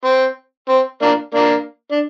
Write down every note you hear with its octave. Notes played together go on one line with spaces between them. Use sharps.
C4
C4
A#3 D4
A#3 D4
D4